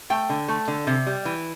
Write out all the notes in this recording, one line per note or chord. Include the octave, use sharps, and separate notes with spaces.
A3 G5
D3
A3
D3
C3
G3
E3